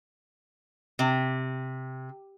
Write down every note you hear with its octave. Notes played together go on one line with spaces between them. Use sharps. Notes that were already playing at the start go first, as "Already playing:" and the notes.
C3